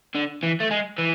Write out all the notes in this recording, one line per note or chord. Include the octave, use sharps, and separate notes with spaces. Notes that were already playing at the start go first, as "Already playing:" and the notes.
D3
E3
A3
G#3
E3